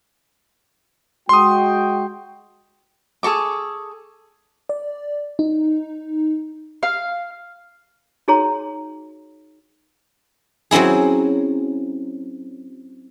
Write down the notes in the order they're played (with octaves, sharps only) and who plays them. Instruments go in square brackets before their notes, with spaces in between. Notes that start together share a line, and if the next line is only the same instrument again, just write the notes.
[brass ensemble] G#3 F#4 G5 [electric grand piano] C6 D#6
[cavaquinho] G#4 A4 C#6 D6
[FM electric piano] D5
D#4
[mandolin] F5
[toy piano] D#4 F#4 G#4 C#5 A#5 C6
[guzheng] F#3 C4 C#4 E4 G#4